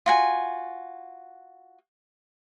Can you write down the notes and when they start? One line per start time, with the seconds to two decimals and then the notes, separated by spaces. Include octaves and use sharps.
0.06 F4 F#4 G#5